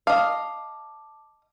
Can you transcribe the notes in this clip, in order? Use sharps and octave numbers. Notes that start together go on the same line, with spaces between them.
D#5 F5 A5 D6